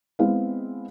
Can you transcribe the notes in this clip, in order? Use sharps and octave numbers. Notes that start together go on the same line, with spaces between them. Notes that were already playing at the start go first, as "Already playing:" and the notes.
G#3 B3 C4 E4 F5